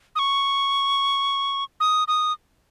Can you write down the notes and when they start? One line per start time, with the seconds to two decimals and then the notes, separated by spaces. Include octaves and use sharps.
0.16 D#6
0.19 C#6
1.80 D#6
2.08 D#6